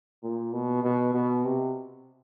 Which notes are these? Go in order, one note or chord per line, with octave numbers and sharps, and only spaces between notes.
A#2
B2
B2
B2
C3